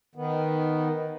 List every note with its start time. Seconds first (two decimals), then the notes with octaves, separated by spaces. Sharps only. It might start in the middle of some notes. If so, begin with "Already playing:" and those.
0.15 D#3 B3